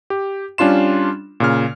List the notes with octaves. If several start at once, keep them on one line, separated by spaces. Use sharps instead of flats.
G4
G3 C#4 D4 F4 C6 E7
A#2 C#3 F6